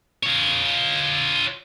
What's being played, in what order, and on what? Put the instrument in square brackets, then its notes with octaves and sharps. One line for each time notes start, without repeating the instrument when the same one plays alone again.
[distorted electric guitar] F4 C#5